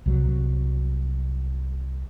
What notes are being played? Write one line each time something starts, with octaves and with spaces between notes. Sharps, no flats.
C2 F#3